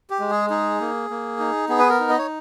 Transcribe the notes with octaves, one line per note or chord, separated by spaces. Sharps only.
G4
G#3
G#4
D#4 G#4
A#3
A#3
D#4
B3 G#4
B4
A#4
D#4
D#5
C#5